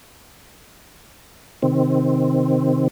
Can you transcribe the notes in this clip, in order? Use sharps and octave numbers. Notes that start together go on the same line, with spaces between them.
C3 D#3 C4